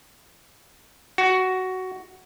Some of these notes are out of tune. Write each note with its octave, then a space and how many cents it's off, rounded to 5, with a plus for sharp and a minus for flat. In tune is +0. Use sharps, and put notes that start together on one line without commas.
F#4 +10